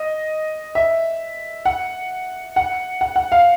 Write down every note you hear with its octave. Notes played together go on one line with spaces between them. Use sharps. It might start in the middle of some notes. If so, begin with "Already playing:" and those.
Already playing: D#5
E5
F#5
F#5
F#5
F#5
F5